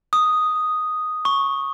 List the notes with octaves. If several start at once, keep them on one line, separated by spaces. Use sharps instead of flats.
D#6
C#6